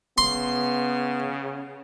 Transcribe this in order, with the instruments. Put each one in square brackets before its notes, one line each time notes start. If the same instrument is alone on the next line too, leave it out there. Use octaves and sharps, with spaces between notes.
[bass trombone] C#3 [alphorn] B3 [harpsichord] C6